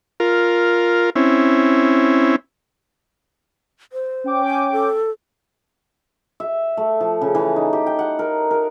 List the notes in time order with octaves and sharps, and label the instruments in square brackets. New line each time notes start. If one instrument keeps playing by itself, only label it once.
[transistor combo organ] F4 A#4
C4 C#4 E4
[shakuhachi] C5
[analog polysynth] C#4 G5 D6
[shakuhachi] G#5
A4
[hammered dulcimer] E5
A3
F3
C#3
E3
D#4
G4
G5
F#5
A#4
A#4